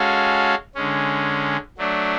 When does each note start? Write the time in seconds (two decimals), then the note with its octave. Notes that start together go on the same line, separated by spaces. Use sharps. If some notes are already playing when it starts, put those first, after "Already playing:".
Already playing: G#3 C#4 F#4 A4 F5
0.75 D3 G#3 C#4
1.77 F#3 A3 D4